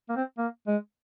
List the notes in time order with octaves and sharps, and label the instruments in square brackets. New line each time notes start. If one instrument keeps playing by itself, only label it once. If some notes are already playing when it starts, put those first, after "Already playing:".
[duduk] A#3
C4
A#3
G#3